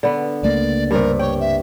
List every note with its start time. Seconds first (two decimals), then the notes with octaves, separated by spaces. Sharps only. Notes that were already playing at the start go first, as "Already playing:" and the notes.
0.03 D3 B3
0.43 C#2 A3 A#3 D5
0.91 G2 C3 A#4
1.19 C#5 G5
1.40 E5